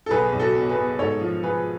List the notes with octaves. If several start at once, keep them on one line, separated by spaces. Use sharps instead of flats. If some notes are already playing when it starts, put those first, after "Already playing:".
A4
B1 G#4 B4
B1
F#4 A4
B2
G#4 B4
B2
G#2 A4 C#5
F3
F3 G#4 B4